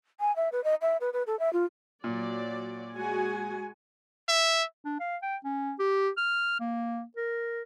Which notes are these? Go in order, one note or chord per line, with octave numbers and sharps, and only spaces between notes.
G#5
E5
B4
D#5
E5
B4
B4
A4
E5
F4
A#2 F#3 D5
G#3 F#4 G#5
E5
D4
F5
G5
C#4
G4
F6
A#3
A#4